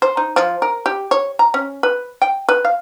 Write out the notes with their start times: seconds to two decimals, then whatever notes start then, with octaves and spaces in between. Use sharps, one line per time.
0.02 C5
0.17 D#4
0.36 F3
0.62 A#4
0.86 G4
1.11 C#5
1.39 A#5
1.54 C#4
1.83 B4
2.22 G5
2.49 B4
2.65 F5